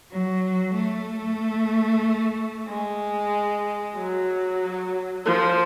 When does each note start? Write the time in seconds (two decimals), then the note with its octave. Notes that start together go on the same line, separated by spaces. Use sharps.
0.10 F#3
0.75 A3
2.67 G#3
3.96 F#3
5.25 F3